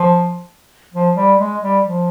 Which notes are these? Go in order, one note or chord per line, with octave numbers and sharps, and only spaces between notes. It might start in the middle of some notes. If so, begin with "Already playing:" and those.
Already playing: F3
F3
G3
G#3
G3
F3